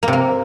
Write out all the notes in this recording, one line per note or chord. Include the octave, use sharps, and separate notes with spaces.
A#3
C3
A#3